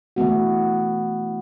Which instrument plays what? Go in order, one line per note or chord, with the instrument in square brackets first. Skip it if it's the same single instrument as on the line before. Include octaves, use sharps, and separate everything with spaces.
[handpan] E3 A3 B3 F#4